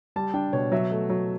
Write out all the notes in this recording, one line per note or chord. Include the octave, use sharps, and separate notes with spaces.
G3 A5
D4 G5
B2 C#5
F#3 E5
A3
F#3